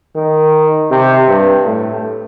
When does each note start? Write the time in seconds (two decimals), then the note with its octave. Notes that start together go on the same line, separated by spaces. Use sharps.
0.16 D#3
0.91 C3
1.28 G2
1.65 A2